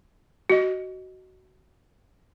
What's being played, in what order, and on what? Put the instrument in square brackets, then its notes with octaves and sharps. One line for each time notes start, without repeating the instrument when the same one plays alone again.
[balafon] F#4 D#5